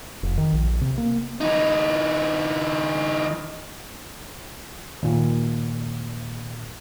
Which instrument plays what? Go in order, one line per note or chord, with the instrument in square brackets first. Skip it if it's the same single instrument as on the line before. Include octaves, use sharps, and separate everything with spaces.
[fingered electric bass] F1
D#3
A#1
C3
A#3
[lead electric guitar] E3 D#4
[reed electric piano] D#2 A#2